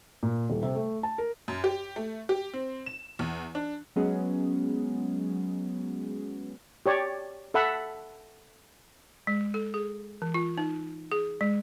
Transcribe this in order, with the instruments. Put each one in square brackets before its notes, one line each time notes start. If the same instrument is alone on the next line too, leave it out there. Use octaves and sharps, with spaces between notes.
[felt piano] A#2
D#1
C3
A3
A5
A#4
[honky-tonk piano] F#2
G4
A3
G4
C4
E7
E2
D4
[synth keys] F#3 G#3 B3 C#4 G#4
[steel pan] G4 C#5 D5
A4 E5 F#5 B5
[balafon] G#3
A4
G#4
E3
F4
D#4
G#4
G#3